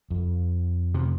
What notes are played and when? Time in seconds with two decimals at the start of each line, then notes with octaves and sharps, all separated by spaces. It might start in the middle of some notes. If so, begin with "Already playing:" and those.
0.10 F2
0.94 C3